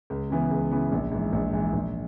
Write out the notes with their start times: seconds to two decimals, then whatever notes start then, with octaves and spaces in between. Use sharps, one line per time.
0.10 C#2
0.30 C#3 E3 B3
0.51 C#2
0.71 C#3 E3 B3
0.92 A#1
1.12 G#2 E3
1.33 A#1
1.53 G#2 E3
1.73 A#1